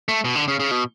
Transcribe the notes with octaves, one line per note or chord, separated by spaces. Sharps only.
A3
B2
D3
C#3
C#3
B2